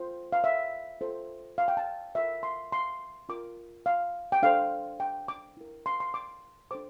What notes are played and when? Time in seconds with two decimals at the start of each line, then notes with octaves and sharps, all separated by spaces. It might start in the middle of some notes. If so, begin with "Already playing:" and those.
Already playing: F4 A4 C5
0.33 F5
0.44 E5
1.01 F4 A4 C5
1.58 F5
1.68 G5
1.77 A5
2.15 F4 A#4 E5
2.43 C6
2.72 C6
3.29 F4 A#4 D6
3.86 F5
4.32 G5
4.42 D4 A4 C5 F5
5.00 G5
5.28 D6
5.57 E4 A#4
5.86 C6
6.00 C6
6.14 D6
6.71 D4 A4 C5 D6